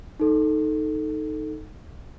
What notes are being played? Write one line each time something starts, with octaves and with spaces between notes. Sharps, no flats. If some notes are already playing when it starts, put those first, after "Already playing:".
D#4 A4